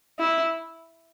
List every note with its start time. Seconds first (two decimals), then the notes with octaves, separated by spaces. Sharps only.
0.19 E4